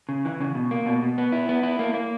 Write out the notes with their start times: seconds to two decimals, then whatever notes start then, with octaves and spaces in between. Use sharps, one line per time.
0.09 C#3
0.25 E3
0.40 C#3
0.55 B2
0.71 A#3
0.86 B2
1.03 B2
1.18 B3
1.32 E4
1.49 B3
1.63 E4
1.79 A#3
1.94 A#3